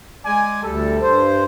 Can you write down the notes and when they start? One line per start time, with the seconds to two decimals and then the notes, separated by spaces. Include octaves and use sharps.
0.24 G#3 D5 G#5
0.63 D2 G3 A4
1.01 G2 C5